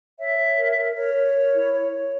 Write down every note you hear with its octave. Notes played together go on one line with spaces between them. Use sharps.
C#5 E5
C#5
A#4
A#4
A#4 C#5
A#4
A#4
E4
C#5
C#5